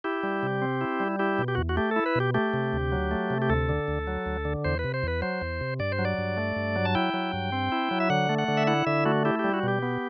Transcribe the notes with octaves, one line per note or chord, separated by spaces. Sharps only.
E4 G4
G3
C3
C4
E4
G3
E4 G4
B2
G4
E2 F#4
F#4
A3 G4
E4 A4
B4
B2 G4
A3 G4
C3
D2
F#3
A3
C3
G4
D2 A4
D3
D2
F#3
D2
D3
E2 C5
B4
C3
C5
E2 B4
F#3 C5
E2
C3
G2 D5
C5
F#3
D5
G2
A3
G2
F#3
A5
E4 G5
F#3
G2
C4
E4
F#3
E5
D3 F#5
A3
F#5
D3
E5
E4 F#5
D3 E5
A3 F#4
E4 G4
G3 G4
F#4
B2 G4
B3